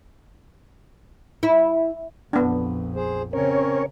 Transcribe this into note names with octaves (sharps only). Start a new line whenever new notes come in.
E4
A#1 F2 B3 D4
G#4 C5
C#3 C4 C#4 A#4 C#5